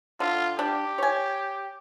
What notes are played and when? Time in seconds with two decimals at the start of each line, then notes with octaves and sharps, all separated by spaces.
0.20 D3 F4
0.59 D4 G4
0.98 C#5 G#5